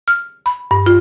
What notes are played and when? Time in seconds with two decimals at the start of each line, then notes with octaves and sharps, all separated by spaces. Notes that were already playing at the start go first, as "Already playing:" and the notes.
0.08 F6
0.46 B5
0.71 G2
0.86 F4